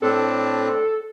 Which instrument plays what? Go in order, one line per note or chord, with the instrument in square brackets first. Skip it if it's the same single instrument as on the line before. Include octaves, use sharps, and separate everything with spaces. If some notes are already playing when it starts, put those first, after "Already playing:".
[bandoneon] A2 C4 D4 [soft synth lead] A4